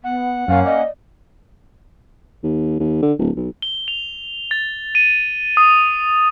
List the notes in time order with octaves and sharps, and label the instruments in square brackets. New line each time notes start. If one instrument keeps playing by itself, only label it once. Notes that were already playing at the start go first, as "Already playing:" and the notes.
[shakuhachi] B3 [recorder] F#5
[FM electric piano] F#2 C#5 [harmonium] A#3 C#4 [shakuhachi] F5
[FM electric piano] D5 [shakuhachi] D#5
[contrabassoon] D#2
D#2
D3
D1
B1
[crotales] G7
F7
A6
D#7
D#6